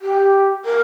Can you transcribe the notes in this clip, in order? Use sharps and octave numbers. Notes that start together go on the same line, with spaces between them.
G4
A#4